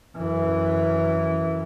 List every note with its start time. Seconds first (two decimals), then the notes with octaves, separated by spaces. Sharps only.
0.17 F#2 E3